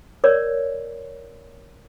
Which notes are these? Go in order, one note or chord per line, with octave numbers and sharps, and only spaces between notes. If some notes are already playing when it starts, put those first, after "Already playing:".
A#4 C#5 D5